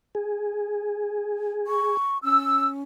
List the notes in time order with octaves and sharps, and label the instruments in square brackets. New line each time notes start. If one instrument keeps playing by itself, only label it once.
[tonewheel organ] G#4
[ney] C#6
[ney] C#4 [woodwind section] E6